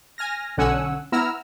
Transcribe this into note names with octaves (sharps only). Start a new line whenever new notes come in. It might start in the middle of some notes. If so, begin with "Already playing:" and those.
G#5 F6 A#6
B1 D3 C#4 F#5 G#5 E6
B3 E4 A#5 E6 F6